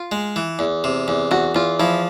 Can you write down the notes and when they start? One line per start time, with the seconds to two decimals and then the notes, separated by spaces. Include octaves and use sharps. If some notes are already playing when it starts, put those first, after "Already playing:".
Already playing: F4
0.12 G#3
0.36 E3
0.59 E2
0.84 C3
1.08 E2
1.31 E2 F#4
1.55 E2 F4
1.79 F3 E4